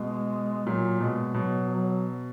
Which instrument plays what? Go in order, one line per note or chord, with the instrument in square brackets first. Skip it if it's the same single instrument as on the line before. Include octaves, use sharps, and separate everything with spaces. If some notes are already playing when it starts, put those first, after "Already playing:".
Already playing: [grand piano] B2 [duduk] G#3
[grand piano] A#2 [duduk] F#3
[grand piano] B2 [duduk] G#3
[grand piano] B2 [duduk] F#3
[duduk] F#3